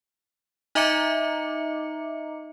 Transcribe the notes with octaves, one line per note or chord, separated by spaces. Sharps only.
D#4 D#5 E5 A#5 D6 C#7